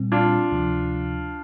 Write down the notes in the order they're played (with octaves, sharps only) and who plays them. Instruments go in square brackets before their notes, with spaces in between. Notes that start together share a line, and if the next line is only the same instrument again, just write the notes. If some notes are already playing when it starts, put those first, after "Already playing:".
Already playing: [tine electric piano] A#2 G3 C4
[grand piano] D4 F4
[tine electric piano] D2 C3 F3